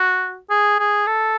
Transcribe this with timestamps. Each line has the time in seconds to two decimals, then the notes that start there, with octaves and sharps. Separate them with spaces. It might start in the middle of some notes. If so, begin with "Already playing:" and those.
Already playing: F#4
0.50 G#4
0.79 G#4
1.07 A4